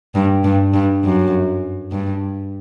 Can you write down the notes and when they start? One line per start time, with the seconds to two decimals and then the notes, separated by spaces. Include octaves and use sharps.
0.15 G2
0.44 G2
0.74 G2
1.04 F#2
1.92 G2